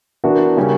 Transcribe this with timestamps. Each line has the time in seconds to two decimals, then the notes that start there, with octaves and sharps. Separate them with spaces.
0.24 E3 B3 D4 F#4 A#4
0.57 C#3 G3 C#4 G4 A#4